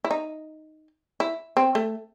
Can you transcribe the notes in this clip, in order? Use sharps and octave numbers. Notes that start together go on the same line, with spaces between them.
E4
D#4
E4
C4
A3